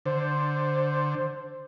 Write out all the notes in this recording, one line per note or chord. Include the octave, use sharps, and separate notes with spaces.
D3 C5